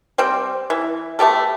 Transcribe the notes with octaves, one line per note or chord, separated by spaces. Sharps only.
G3 C4 G5
E3
A3 B3 G4 A4